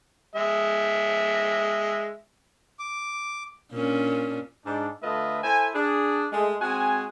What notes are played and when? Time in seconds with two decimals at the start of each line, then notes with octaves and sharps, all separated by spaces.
0.36 G#3 E5
2.79 D6
3.72 A#2 C#4 D4
4.66 G#2 D4
5.03 D3 A3 F4 B4 D#5 E5
5.43 E4 A4 C5 G#5
5.74 D4 G#4
6.32 G#3 A3
6.61 G#3 C4 F#4 G#5